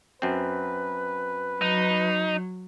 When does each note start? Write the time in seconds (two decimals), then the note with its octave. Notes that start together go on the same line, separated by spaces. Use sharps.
0.22 F#2 C4 B4
1.62 F#3 D#4